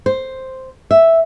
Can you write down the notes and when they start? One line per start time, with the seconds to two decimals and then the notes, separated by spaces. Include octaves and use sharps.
0.06 C5
0.91 E5